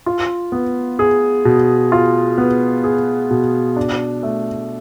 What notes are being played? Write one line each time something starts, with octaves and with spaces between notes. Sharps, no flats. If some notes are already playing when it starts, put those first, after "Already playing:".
F4
B3
G#4
B2
F4
B3
G#4
B2
D4
A3